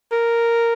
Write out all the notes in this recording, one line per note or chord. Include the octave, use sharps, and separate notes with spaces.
A#4